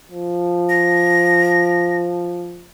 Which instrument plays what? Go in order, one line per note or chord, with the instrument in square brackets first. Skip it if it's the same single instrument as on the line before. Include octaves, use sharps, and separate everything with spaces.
[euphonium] F3
[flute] A#6